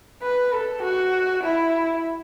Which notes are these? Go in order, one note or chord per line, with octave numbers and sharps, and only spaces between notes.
B4
A4
F#4
E4